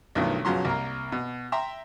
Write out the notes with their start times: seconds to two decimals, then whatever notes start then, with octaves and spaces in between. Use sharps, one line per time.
0.15 B1 G2 D#3 F3 A3
0.45 B1 C#3 F3 F#3 C6
0.65 C2 A#3 A#4
1.12 B2
1.52 E5 G5 A#5 C6